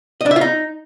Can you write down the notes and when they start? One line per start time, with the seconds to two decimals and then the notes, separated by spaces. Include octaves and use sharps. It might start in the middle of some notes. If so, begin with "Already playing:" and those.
0.21 D#5
0.26 D4
0.31 E5
0.36 F4
0.41 D#4